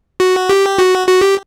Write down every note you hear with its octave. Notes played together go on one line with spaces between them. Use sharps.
F#4
G4
F#4
F#4
G4